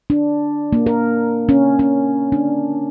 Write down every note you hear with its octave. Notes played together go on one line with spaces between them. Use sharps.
D4
A#3
A#4
C#4
C#4
D4